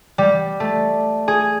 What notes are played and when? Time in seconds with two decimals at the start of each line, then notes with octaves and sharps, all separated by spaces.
0.18 G3
0.60 A3
1.28 G#4